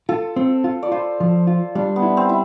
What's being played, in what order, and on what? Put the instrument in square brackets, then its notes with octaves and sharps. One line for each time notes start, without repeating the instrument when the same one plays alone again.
[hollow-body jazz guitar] F4 [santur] A4
[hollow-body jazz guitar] C4
F4
[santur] D5
[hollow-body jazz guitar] F4 [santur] C5
[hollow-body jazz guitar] F3
F4
[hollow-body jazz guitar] G3 [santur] D4
[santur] B3
[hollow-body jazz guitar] E4
[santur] C4
E4